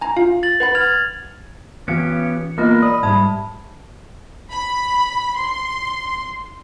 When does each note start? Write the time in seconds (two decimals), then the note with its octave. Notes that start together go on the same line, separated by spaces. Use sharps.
0.01 G#5 A#5
0.17 F4 F5
0.43 A6 F#7
0.60 B4 F#5 B5
0.75 F6 G#6 F7
1.88 E3 B3 C#4 G4 C#7
2.58 G#3 A#3 B3 F4 A#4 D#5 B5
2.82 D5 B5 D#6 D#7
3.03 G#2 G3 E5 A5 G#6
4.52 B5
5.37 C6